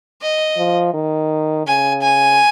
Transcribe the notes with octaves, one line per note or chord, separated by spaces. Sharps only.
D#5
F3
D#3
C#3 G#5
G#5